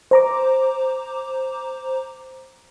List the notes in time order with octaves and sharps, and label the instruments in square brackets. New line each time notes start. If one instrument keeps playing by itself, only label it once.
[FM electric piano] C5 A#5 D6